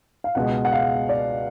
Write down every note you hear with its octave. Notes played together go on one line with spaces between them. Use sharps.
F5
C#2 B2 G#3 F#5
F#5
F5
D5